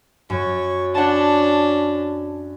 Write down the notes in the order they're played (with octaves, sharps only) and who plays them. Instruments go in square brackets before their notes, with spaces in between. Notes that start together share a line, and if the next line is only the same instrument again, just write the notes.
[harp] F#2 [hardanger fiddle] C#5
[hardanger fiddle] C#4 D4 [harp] F#5 A5